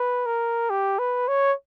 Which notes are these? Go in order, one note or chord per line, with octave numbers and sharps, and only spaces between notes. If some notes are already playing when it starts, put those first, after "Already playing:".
Already playing: B4
A#4
G4
B4
C#5